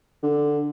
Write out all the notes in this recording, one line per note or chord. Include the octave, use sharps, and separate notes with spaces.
D3